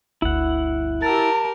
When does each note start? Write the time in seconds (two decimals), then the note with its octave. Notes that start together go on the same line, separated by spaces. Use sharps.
0.22 G1 D2 E4 F#5
1.02 G4 A#4 A5 E6 A6